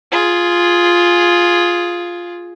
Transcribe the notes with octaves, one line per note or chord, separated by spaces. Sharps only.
F4 G#4